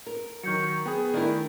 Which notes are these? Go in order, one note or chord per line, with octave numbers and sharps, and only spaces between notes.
A#4
D#3 F#3 C#6 G6 C#7
B3 G#4 G5
D#3 A3 D4 E4 A#4